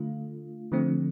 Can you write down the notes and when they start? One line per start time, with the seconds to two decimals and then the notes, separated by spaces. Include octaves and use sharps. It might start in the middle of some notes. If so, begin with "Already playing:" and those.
Already playing: D3 A3 F4
0.72 D3 F3 A3 C4